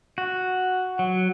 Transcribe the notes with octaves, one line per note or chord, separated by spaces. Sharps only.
F#4
F#3